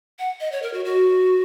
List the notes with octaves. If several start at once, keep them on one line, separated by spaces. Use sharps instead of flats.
F#5
D#5
C#5
A#4
F#4
F#4